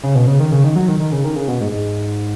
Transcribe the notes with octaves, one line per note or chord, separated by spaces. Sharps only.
C#3
B2
C#3
D#3
C#3
D#3
F#3
D#3
D#3
C#3
D#3
C#3
B2
G#2
G#2